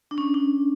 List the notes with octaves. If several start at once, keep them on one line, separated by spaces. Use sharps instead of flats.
D4
C#4
D4